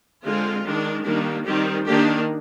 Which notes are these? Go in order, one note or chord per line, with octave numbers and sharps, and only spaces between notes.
D3 G#3 C4 F4
D#3 G#3 D4
D#3 G3 A#3 D4
D#3 G3 C4 G4
D#3 A#3 D4 G4